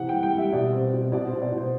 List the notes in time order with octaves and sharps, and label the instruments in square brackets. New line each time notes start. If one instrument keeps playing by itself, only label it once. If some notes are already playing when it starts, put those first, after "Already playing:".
Already playing: [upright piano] C3 E3 F#5
G3 G5
G5
G3 E5
B2 D5
C4
B2
B2 D5
C5
B2
D5
B2
C5